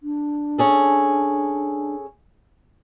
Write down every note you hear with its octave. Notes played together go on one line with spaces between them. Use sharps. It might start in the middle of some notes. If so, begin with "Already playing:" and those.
D4
C#4 G#4 A4